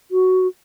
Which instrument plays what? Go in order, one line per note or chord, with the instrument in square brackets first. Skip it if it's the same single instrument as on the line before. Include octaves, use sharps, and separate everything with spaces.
[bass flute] F#4